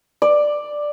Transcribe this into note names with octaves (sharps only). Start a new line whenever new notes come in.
D5